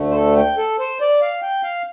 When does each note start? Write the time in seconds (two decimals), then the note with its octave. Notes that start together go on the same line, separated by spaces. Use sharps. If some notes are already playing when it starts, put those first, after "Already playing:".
Already playing: D2 D3 A3
0.11 C5
0.15 A4
0.37 G5
0.57 A4
0.79 C5
1.01 D5
1.22 F5
1.43 G5
1.63 F5